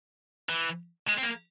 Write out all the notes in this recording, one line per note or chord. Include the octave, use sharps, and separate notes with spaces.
E3
G#3
C4
A#3